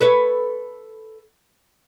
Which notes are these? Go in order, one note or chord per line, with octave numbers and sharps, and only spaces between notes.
A4 B4 C#5